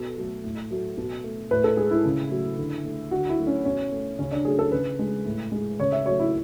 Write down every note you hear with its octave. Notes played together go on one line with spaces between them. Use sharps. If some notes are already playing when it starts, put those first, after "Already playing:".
Already playing: B2 A4
F#3 A3
A2
F#3 A3
B2
A3
A2 B4
A4
G#3 G#4
E4
C#3
F#3 A3
D3
A3
D3 F#4
E4
F#3 A3
C#4
B2 C#4
A3
C#3 C#4
D4
F#3 A3 G#4
A4
C#3 B4
G#3
A2
G#3
C#3 C#5
E5
F#3 A3 C#5
E4